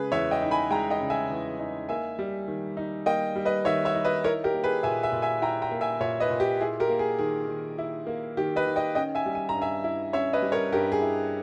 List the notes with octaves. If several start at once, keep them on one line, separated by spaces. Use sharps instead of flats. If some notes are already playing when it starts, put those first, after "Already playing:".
Already playing: C#3 G#3 G#4 B4
E2 C#5 E5
D#5 G5
D#4
G#5 B5
G#3 G5 A#5
D#5 G5
C#3
E5 G#5
E2
D#4
A#3 E5 G#5
G3
D#3
D#4
A#3 D#5 G5
G3
B4 D#5
D#3 C#5 E5
C#5 E5
D#4
B4 D#5
E4 A#4 C#5
G4 A#4
A#3
G#4 B4
A#2 E5 G#5
E5 G#5
A#2
E5 G#5
E4 G5 A#5
G5 A#5
A#3
E5 G#5
A#2 C#5 E5
B4 D#5
A#2
G4
E4 G#4
G4 A#4
A#3
G#4
D#3 G#4
D#3
E4
A#3
D#3 G4
B4 D#5
D#3
D#5 G5
C#4 D#5 G5
E5 G#5
G3
G#5
A#5
G2
E5 G#5
E4
C#4 C#5 E5
B4 D#5
G3
A#4 C#5
G2 G4 A#4
G#4
E4